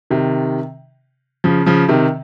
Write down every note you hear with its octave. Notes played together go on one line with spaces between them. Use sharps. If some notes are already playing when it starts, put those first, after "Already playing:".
C3 D#3
C#3 F3
C#3 F3
C3 D#3